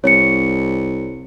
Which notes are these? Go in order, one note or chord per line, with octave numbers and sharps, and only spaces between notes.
C2 C#5 C#7